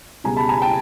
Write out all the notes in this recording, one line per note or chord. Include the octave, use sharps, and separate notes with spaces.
C#2 B2 G3 G#5 A#5
A5 B5
G#5 A#5
G5 A5